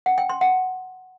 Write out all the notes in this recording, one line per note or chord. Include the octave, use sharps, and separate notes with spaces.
F#5
G5
C6
F#5